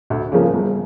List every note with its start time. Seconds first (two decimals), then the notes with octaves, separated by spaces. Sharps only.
0.10 D2
0.32 C#3 F3 A#3
0.53 G1